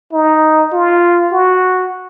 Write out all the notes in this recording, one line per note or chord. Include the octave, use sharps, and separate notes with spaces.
D#4
F4
F#4